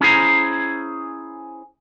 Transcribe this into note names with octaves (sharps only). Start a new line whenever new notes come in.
C#4 E4 G#4 C5 A#5